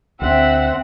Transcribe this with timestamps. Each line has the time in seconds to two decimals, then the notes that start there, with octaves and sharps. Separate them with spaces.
0.22 D2 C4 E5 F#5